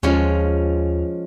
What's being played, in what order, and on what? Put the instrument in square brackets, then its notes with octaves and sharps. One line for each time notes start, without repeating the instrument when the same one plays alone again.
[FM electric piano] D#2 F4 [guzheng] F3 G#3 C#4